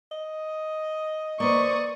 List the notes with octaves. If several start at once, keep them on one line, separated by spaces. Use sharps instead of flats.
D#5
A#3 B4 C5 D5 C#6 D#6